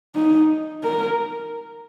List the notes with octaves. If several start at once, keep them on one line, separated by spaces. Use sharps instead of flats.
D#4
A#4